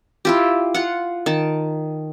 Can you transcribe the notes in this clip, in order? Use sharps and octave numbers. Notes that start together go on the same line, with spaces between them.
E4 F4 G4
F4 F#5
D#3 A5